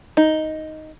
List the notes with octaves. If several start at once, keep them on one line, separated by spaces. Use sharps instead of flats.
D#4